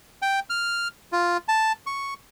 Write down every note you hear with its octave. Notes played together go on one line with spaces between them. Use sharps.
G5
F6
F4
A5
C#6